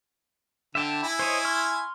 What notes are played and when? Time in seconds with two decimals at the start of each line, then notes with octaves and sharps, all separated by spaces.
0.75 D3 E5 G5 A5
1.03 E4 G#5
1.19 C5 C#5 D#5
1.45 C6 C#6 F6